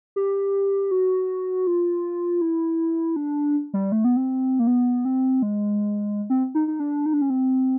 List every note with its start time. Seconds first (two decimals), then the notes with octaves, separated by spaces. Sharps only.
0.16 G4
0.91 F#4
1.67 F4
2.41 E4
3.16 D4
3.74 G3
3.92 A3
4.04 B3
4.16 C4
4.59 A#3
4.67 B3
5.05 C4
5.42 G#3
6.30 C4
6.55 D#4
6.68 D#4
6.80 D4
7.06 D#4
7.13 D4
7.22 C#4
7.30 C4